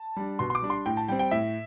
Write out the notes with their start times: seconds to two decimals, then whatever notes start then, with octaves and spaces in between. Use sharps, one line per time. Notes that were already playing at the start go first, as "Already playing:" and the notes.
Already playing: A5
0.16 G3 D4
0.39 B2 C6
0.50 C6
0.55 D6
0.62 G3 D4
0.70 C6
0.86 A2 G5
0.97 A5
1.08 G3 C4 G5
1.19 G5
1.31 A2 E5